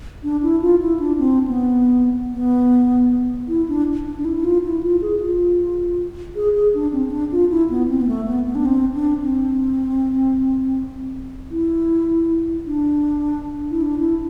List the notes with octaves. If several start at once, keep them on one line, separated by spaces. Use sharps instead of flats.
D4
E4
F4
E4
D4
C4
B3
B3
E4
D4
D4
D4
E4
E4
F4
E4
F4
G#4
F4
G#4
G#4
D4
C4
C4
D4
F4
E4
B3
C4
B3
A3
B3
B3
D4
C4
D4
C4
E4
D4
E4
D4
E4